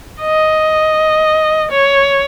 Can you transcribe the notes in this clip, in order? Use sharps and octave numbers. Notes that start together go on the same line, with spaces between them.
D#5
C#5